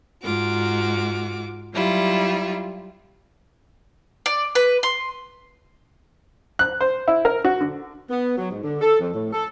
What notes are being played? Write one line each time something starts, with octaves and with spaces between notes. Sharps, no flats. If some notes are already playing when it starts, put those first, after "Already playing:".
G#2 F4 F#4 D6
F#3 G3 E4 F4
D5
B4
C6
F#6
C5
E4
A#4
F#4
D3
B3
F#3
G#2
D3
A4
F2
A2
A4